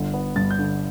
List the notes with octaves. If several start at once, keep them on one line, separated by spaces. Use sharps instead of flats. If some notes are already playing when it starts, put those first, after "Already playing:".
Already playing: G1 D3
B3
G2 A6
G6
D3